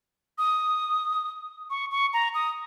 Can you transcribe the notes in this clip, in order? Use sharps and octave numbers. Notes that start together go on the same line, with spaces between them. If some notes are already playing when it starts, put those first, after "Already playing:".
D#6
C#6
C#6
A#5
D#6